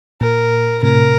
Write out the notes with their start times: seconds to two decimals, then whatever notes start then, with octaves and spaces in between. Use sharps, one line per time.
0.21 A#2 A#4
0.83 A2 C3 A#4